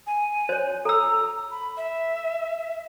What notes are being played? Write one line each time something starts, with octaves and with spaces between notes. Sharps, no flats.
G#5
C5 C#5
A4 A#5 E6
B5
E5